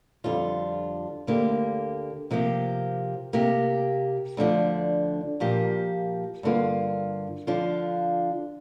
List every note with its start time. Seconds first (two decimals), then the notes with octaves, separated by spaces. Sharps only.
0.24 F2 D3 G3 D4 F4
1.27 D2 D3 A#3 G4
2.31 C3 F3 A#3 G4
3.33 C3 A#3 G4
4.37 D2 D3 F3 D4
5.40 A#2 F3 A#3 G4
6.43 G2 D3 A#3 F4
7.47 D3 F3 D4 F4